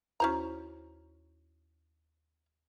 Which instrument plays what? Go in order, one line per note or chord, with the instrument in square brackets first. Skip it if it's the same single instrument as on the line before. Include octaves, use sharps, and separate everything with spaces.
[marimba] D#2 E4 F#4 [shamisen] C#4 C5 A#5